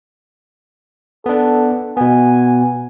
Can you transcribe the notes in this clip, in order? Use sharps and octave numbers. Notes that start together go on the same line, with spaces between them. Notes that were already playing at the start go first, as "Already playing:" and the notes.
B3 D4 A4
B2 B3 G#5